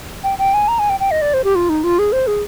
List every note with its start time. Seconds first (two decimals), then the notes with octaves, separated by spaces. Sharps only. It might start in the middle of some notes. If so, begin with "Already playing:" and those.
0.24 G5
0.38 G5
0.54 G#5
0.68 A#5
0.79 G#5
0.89 G5
1.00 G5
1.11 D#5
1.22 D5
1.34 C5
1.44 G4
1.55 F4
1.69 D#4
1.84 F4
1.99 G#4
2.12 C5
2.27 G#4